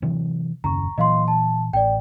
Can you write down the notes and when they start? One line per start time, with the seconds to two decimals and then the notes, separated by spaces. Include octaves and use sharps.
0.02 C3 E3 F#3
0.64 D#1 F#2 C#3 A#5 C#6
0.98 A#2 E3 F#3 D#5 F5 C6
1.28 A5
1.73 A1 D5 G5